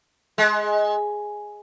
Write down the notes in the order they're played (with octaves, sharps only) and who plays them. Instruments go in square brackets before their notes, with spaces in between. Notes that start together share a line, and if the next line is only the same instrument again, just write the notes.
[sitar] G#3